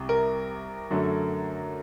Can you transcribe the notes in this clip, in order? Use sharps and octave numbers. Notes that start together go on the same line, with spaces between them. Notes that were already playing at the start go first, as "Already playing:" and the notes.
Already playing: C2 C3
A#4
F#2 D3 A3